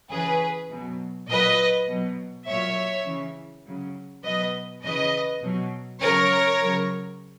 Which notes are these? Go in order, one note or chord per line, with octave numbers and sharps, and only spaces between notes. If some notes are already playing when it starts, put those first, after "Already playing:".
C#3 E3 G#4 B4
B2 F#3
A#2 F#3 B4 D#5
B2 F#3
A#2 F#3 C#5 E5
C#3 E3
C#3 F#3
B2 F#3 B4 D#5
C#3 E3 B4 D#5
B2 F#3
C#3 F#3 A#4 C#5
C#3 F#3